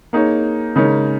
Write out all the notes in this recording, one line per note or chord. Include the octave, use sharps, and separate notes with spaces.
A#3 D#4 G#4 C#5
C#3 G#3 D#4 A#4 C#5